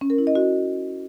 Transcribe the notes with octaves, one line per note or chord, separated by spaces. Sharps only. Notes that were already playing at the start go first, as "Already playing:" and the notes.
C#4
A#4
E4
D#5
F#4